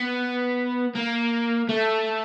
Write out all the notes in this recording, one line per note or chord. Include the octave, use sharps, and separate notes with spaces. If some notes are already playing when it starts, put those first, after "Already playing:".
Already playing: B3
A#3
A3